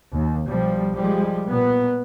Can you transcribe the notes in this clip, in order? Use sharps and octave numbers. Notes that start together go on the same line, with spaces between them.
D#2
B1 F3 G3
F3 G3 G#3
A#2 B3